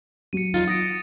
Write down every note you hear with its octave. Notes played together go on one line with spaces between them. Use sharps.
F#3 F#4 C#7 D#7
E2 D#4 F4 A6
F#5 D#6 A#6 D7